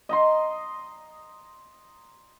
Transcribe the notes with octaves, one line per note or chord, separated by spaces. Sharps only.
D#5 A#5 C6